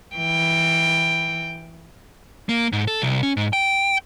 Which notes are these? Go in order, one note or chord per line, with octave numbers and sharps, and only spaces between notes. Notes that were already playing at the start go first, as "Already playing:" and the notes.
E3 G5
A#3
G#2
A4
C2
C#4
G#2
G5